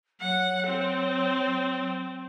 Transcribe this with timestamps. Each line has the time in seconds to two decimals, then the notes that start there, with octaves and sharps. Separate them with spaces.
0.21 F#3 F#5
0.67 C4